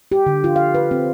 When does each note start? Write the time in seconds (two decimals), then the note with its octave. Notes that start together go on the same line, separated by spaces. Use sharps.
0.12 G4
0.26 D3
0.44 F4
0.56 F5
0.74 B4
0.91 C4